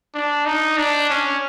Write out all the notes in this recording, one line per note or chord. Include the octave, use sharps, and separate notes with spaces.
D4
D#4
D4
C#4